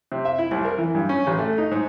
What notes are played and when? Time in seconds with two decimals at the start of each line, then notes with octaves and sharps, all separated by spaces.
0.12 C3
0.25 E5
0.39 E4
0.51 C2
0.65 A#4
0.78 E3
0.95 G2
1.09 C#4
1.27 A1
1.39 A3
1.58 D#4
1.71 G#2